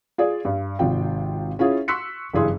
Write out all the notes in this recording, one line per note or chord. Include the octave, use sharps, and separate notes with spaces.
F4 G#4 D5
G2
G#1 C3 F4 G5
C#4 E4 F4 G#4
C6 C#6 E6 F#6 B6 C#7
F#1 G2 E3 G#4 C6